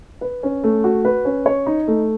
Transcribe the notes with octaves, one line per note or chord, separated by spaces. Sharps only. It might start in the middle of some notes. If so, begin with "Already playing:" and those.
B4
C#4
A3
F#4
B4
C#4
C#5
D#4
A3